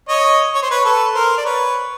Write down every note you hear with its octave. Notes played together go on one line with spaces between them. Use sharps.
C#5 D#5
C#5
C5
B4 C#5
A4 B4
A#4 C5
D5
B4 C#5